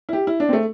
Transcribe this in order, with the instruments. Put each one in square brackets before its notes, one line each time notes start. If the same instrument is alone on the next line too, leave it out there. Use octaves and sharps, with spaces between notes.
[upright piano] E4
G4
E4
D4
C4
A3